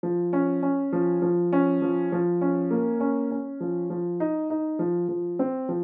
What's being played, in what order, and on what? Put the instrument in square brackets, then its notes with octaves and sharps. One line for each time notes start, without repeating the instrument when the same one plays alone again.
[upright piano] F3
C#4
C#4
F3
F3
C#4
F3
F3
C#4
A#3
C#4
C#4
F3
F3
D#4
D#4
F3
F3
C4
F3